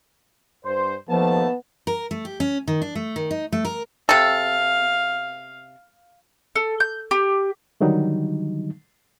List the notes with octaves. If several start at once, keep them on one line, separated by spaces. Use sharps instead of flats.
G2 C5
D#2 F3 A3 B3 A5
A#4
A3
G4
C#4
D#3
D4
A3
D#3
D#4
A3
A#4
C3 A4 F5
A4
G6
G4
D3 D#3 F#3 G3 D#4